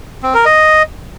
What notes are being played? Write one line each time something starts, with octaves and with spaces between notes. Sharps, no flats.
C4
A#4
D#5